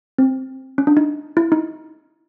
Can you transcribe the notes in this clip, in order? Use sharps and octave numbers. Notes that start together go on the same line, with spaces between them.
C4
C#4
D4
D#4
E4
D#4